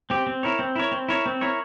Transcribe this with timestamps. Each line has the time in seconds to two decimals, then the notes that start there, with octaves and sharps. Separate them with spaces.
0.10 C4 G4
0.27 C4
0.43 E4 A#4 C#5
0.59 C4
0.76 E4 A#4 C#5
0.92 C4
1.08 E4 A#4 C#5
1.26 C4
1.41 E4 A#4 C#5